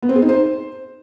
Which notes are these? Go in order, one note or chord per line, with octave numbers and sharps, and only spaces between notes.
B3
C4
G#4
D#4
C5